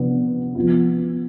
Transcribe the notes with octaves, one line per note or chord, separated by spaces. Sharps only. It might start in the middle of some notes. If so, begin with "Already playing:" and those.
Already playing: C3 F3 B3 D4
F3 B3 F4